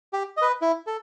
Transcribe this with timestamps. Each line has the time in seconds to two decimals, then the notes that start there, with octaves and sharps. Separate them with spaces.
0.13 G4
0.37 B4 D#5
0.62 E4
0.87 A4